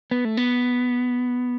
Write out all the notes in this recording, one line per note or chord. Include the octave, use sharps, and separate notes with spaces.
B3
A3
B3